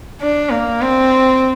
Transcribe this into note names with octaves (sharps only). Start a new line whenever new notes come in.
D4
A#3
C4